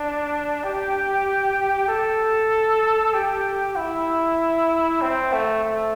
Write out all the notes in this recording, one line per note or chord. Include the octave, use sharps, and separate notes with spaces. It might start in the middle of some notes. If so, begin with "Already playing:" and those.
Already playing: D4
G4
A4
G4
E4
C4
A3
A3